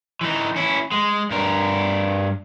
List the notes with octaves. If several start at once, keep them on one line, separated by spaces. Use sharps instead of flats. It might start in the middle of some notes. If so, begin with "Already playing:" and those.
E3 D#4
C#4 E4
G#3
G2 A#4